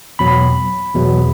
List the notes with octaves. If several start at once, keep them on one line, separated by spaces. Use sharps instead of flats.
E2 B2 F#3 B5
E2 B2 F#3